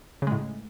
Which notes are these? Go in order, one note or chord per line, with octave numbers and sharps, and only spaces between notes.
A2 C#3 G#3